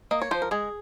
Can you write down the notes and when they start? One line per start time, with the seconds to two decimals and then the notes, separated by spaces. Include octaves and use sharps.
0.11 A#3 D#5
0.22 C#5
0.31 F3 C5
0.42 A#4
0.51 G#3 G#4